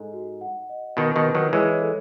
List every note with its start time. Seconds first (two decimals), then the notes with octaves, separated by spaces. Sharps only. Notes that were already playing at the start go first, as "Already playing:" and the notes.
Already playing: G#2 A4 D#5
0.13 F#4
0.41 F#5
0.69 D#5
0.97 B2 D#3 D#5
1.16 B2 D#3
1.25 B4
1.34 D#3 F#3
1.53 E3 G#3 C#5
1.81 A4